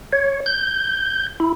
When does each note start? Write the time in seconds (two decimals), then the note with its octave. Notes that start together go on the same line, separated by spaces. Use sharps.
0.13 C#5
0.46 G6
1.40 E4